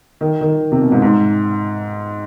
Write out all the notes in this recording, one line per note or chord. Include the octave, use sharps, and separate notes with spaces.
D#3
D#3
C3
B2
G#2
G#2